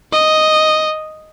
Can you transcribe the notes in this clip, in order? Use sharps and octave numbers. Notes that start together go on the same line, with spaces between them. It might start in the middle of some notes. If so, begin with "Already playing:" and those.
D#5